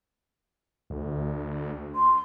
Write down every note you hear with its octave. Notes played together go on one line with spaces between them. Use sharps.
D2
C6